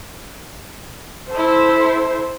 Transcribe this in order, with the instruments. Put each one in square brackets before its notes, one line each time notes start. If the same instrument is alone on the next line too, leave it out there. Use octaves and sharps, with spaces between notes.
[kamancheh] E4 A4 [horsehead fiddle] C5